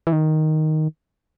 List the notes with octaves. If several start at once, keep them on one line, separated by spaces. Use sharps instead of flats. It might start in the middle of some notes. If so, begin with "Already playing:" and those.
E3
D#3